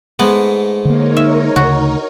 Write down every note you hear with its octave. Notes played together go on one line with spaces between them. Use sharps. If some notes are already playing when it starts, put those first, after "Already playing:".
G#2 G#3 A3 B3
D3 A#3 D#4 A#4 C#5
E5
D2 C#3 F#4